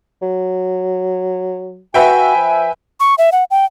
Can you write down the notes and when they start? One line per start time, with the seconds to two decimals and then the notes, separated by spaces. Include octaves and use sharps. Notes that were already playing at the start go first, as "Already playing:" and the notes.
0.22 F#3
1.94 F#4 B4 E5 G5 G#5
2.36 F3
3.00 C#6
3.18 E5
3.32 F#5
3.51 G5